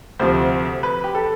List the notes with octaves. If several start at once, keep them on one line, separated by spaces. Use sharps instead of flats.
D2 C3 F3 C5
B4
G4
A4